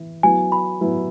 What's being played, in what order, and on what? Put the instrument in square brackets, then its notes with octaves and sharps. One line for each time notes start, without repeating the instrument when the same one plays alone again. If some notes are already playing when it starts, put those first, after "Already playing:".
Already playing: [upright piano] E3
[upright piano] F#3 B3 E4 [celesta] G#5
[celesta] B5
[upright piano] F#3 B3 E4